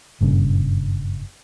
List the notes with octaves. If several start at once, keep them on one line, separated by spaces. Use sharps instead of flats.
F#1 G2 A#2 C#3